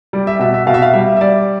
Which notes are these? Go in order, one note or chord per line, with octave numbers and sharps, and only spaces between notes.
G3 D5
E5
B2 E5
E5
B2 F5
E5
F5
G3 E5
E5
G3 D5